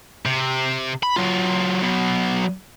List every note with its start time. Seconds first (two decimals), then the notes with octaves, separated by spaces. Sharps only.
0.26 C3
1.03 B5
1.16 F#3 F4
1.82 F#3 B3